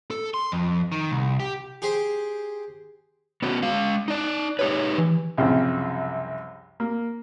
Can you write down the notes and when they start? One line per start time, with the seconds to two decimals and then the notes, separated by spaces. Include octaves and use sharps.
0.11 A4
0.34 C6
0.52 F2
0.92 D#3
1.11 C2
1.40 G4
1.82 G4 G#4 C5
3.42 B3 C#4 F#4
3.63 G#3 F5
4.08 D#4 D5
4.59 D#4 G4 B4 C#5
4.98 E3
5.38 C2 F#2 C#3 F3 C4
6.80 A#3